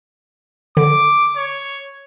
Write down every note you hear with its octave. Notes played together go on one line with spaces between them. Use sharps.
D3 D6
C#5